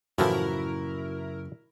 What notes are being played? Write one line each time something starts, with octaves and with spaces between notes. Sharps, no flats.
F#2 A2 C#3 E3 F3 E4 F#4 A#4